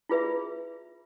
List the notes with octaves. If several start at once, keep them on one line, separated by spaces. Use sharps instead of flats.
E4 F4 G#4 B4 D5 E5